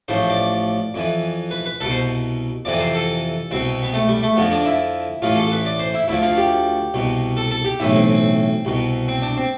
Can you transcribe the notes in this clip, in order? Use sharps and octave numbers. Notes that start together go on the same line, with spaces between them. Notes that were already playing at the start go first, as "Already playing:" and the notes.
A1 A2 F3 C5
D5
F2 E3
B4
B4
C2 B2 A4
C5
F2 C3 E3 D5
C5
A4
C2 B2 C4
B3
A3
G3
A3
F2 D3 F3 B3
D4
E4
A1 A2 E3 F4
A4
B4
D5
C5
E4
D2 D3 F3 E4
F4
G4
C2 B2
A4
A4
G4
B1 A2 E3 E4
C4
C4
C2 B2
C4
D4
C4